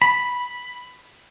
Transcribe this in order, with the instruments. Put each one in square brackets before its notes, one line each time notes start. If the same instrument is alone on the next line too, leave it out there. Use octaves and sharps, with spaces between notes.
[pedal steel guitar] B5